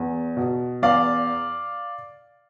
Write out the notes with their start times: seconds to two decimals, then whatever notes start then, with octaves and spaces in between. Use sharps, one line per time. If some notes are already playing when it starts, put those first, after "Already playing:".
Already playing: E2
0.37 B2
0.82 E2 D5 F5